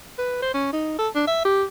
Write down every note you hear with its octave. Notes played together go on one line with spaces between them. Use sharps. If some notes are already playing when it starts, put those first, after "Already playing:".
B4
C5
C#4
D#4
A4
D4
E5
G4